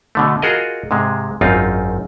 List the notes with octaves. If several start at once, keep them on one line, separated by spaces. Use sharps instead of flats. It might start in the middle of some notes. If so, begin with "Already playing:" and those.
B2 D3 A3
F4 F#4 G#4 A#4 D#5
G#2 C3 G#3
G#1 F#2 C4 D#4 F4